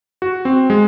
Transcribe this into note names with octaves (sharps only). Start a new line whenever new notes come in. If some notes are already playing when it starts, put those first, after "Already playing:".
F#4
C4
G#3